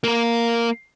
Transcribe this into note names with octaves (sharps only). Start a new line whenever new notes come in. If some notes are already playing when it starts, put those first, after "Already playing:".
A#3 A#4